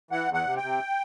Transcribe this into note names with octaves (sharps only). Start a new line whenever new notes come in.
E3 F#5
E2
F#5
C3
G5
C3